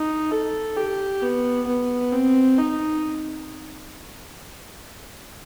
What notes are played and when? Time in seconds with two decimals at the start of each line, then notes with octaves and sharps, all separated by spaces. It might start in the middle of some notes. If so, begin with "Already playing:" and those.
Already playing: D#4
0.31 A4
0.76 G4
1.22 B3
1.67 B3
2.12 C4
2.58 D#4